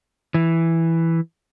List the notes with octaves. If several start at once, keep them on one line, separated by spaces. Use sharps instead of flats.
E3